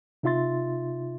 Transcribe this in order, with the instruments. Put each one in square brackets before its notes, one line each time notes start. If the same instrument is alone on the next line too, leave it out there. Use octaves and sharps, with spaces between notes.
[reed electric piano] C3 D#4 F4 E5 C6 A6